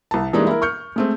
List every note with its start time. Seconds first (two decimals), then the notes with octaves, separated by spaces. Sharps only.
0.11 C2 A5
0.33 E3 G3 G#3 A#3 D4 D#4
0.47 E4 A#4
0.62 C#6 F6 G6 C#7
0.96 G#3 A3 C4